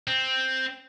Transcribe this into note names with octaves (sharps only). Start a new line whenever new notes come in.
C4